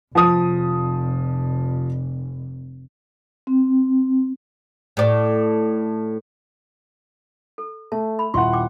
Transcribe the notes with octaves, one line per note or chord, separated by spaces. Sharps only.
F1 F3 D#6
C4
A2 D5
A4
A3 A5
B5
D#1 E4 F#5 C6 C#6
G5 D6